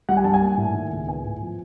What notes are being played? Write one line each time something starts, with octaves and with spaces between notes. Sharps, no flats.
G3 F#5
G#5
G2 A5
G#5
A#3
A2
D#3
C#2
B3 G#5
A2
F3